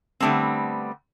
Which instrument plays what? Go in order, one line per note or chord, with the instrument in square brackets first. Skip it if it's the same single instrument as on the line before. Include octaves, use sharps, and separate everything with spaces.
[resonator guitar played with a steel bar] D3 G3 A3 B3 C4